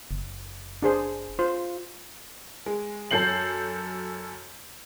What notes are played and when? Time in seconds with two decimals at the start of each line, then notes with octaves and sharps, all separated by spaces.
0.11 F#1
0.82 D4 G#4 C5
1.39 F4 C5
2.66 G#3
3.11 F#2 A4 G6 C7 F#7